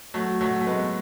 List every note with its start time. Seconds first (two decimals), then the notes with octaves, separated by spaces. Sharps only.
0.14 F#3 A3
0.41 F#3 A3
0.61 A3
0.67 G#3 B3